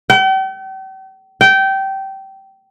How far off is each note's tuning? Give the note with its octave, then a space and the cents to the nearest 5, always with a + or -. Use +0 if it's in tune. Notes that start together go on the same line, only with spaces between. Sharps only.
G5 -40
G5 -20